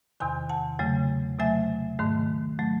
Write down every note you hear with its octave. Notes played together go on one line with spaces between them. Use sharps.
E2 C3 D#3 G#5 C6
F#5 A5
E2 C#3 F#3 A3
C3 F#3 A3 E5 G#5
G#2 D#3 A3
F#3 A3